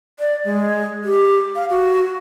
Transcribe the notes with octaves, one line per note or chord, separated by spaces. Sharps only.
D5
G#3
G4
F5
F#4